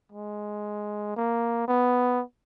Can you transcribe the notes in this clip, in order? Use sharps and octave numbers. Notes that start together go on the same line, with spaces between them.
G#3
A#3
B3